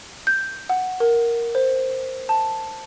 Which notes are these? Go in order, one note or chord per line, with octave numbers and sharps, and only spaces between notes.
G6
F#5
A#4
C5
A5